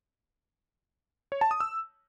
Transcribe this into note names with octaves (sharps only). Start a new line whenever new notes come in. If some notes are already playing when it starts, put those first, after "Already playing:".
C#5
A5
D#6
E6